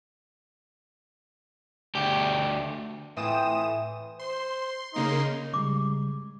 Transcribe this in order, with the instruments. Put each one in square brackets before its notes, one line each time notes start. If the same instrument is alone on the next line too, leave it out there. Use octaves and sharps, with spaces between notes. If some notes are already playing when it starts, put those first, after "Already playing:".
[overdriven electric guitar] D2 G4
[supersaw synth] A2 D#6 E7 [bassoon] E3 [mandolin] C4 F4 G5
[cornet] C5 [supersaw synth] C6
[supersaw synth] C#3 A#3 C6 [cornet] D#4
[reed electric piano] C#3 G3 G#3 [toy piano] D6